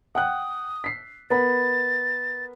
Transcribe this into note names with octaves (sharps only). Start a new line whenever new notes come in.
F#5 G5 D#6 F#6
B6 C7
B3 A#4 B5 A6